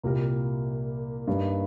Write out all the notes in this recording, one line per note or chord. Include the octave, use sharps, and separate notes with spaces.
C2 A#2 A#3 G4 A#4
G2 G3 A#3 D#4